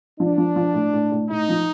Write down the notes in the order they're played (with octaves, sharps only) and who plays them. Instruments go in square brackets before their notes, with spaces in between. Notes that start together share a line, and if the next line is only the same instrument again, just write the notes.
[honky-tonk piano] F3 [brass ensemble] D4
[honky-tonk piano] F3
F3
A2
A2
A2
[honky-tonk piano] A2 [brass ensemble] D#4
[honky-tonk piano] F3